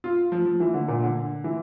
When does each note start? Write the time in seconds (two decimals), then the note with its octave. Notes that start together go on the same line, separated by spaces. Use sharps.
0.04 F4
0.32 F3
0.45 F3
0.60 E3
0.74 D3
0.88 A#2
1.03 D3
1.44 E3